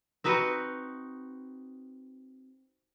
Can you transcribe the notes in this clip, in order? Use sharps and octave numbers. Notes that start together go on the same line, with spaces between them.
C4 D#4 F#4 B4